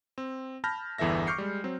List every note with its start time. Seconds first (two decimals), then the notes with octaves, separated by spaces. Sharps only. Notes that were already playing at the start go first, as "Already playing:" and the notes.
0.18 C4
0.64 A5 B5 F6 G6 A#6
0.98 G1 E2 E3 A4 E5 A#6
1.27 C#6 D6 F6 G6 C7 C#7
1.38 G3 G#3
1.64 F#3 C4